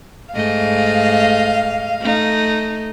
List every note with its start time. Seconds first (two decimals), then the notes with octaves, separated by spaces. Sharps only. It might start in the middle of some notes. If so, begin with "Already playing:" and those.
0.34 G#2 A3 D#5 F5
2.00 A3 D#4